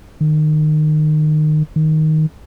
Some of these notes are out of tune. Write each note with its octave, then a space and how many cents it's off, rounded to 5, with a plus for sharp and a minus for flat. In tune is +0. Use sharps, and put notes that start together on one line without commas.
D#3 -25
D#3 +5